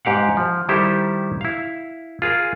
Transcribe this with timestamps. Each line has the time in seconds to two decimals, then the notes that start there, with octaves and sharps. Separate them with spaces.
0.05 G#2 G4 F5 F#5
0.37 F3
0.69 D#3 G3 E4 G4 A4 C5
1.41 E4 F5
2.22 F4 G#4 A#4